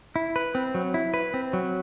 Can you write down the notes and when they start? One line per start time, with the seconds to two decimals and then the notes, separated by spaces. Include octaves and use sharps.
0.16 E4
0.36 B4
0.55 C4
0.75 F#3
0.94 E4
1.14 B4
1.34 C4
1.53 F#3